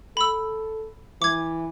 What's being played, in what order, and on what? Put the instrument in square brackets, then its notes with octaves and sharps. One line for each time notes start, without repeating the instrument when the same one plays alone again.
[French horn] A4 [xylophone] B5 E6
[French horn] E3 [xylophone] D6 G#6